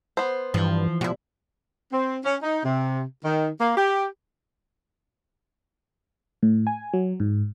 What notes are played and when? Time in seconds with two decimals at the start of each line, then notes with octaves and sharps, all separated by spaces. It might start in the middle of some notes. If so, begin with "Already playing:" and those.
0.17 B3 C5
0.54 G2 E3 F3
1.01 B2 F3 E4 F#4
1.93 C4
2.25 C#4
2.43 D#4
2.65 C3
3.25 D#3
3.61 A#3
3.77 G4
6.43 A2
6.67 G#5
6.93 F#3
7.20 G#2